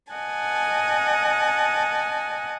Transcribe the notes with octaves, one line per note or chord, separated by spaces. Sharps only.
D#5 F#5 G#5 A5